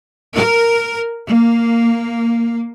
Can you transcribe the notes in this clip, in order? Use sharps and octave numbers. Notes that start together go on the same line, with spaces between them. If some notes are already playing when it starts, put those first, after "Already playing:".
A#4
A#3